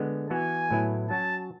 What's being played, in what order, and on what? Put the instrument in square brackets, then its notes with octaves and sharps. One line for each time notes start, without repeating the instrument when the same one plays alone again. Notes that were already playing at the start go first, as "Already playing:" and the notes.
Already playing: [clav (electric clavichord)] D3 G#3 B3
[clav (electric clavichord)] E3 B3 F#4 [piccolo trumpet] G#5
[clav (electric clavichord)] A2 F#3 B3 E4
[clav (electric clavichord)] F#3 C#4 F#4 [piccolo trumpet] A5